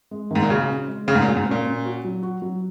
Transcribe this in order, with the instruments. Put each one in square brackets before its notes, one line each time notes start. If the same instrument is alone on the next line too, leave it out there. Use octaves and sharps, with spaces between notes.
[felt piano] G#3
[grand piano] G#2 [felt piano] D#3
[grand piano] A#2
[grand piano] C#3 [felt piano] F#4
[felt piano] C#4
G#3
[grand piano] C#3 [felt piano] C#4
[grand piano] G#2
A#2
[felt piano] F#4
[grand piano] G#2
[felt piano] C#4
[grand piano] A#2
[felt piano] C#4
F#4
F#3
F#4
F#3